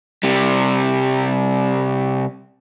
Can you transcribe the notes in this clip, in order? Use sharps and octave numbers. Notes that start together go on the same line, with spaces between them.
C3 G3